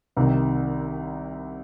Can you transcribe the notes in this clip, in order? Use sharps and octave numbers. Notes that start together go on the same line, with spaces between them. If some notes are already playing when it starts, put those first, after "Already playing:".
C2 C3 D#3